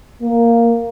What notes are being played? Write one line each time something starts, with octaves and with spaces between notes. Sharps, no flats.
A#3